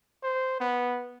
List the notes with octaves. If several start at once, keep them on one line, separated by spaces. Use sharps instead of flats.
C5
B3